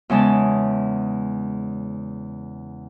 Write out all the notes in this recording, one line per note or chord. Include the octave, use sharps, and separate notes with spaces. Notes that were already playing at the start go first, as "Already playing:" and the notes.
E2 C#3 G#3 A5